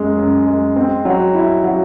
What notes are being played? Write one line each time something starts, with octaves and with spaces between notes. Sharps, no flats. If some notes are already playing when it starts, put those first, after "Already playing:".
Already playing: F#2 G#3
F#2
G#3
C4
F#3
E4
F#3